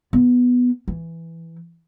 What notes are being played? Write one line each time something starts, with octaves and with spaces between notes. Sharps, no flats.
B3
E3